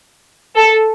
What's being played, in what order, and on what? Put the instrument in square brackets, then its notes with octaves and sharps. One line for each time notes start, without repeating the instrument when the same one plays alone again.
[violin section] A4